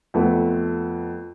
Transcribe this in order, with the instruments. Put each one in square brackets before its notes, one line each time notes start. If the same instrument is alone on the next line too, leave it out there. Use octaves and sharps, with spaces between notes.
[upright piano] F2 A3 B3